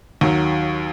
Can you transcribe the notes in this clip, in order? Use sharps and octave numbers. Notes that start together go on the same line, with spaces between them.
D#2 D#3 F#3